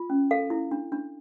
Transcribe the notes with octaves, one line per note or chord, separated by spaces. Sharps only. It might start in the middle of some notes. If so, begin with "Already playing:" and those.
Already playing: F4
C#4
A4 F5
E4
D4
D4